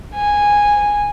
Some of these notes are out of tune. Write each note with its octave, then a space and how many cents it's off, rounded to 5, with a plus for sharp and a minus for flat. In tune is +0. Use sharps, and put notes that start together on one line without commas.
G#5 -10